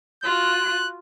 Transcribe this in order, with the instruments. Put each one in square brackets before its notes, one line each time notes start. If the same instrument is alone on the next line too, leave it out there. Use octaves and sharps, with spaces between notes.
[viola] F4 F#4 [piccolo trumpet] F#6